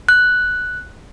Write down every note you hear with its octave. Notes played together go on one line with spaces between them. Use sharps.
F#6